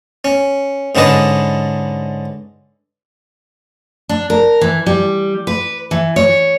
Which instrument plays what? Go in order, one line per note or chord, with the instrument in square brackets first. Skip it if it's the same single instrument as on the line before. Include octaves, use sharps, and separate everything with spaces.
[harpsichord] C#4
G#2 D3 C#4 D4 B4 D#5
[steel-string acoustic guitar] D4
A#4
E3
G3
B4
E3
C#5